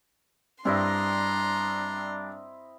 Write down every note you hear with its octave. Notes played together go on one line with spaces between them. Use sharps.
G2 C4 D4 E4 D#5 A#5 C6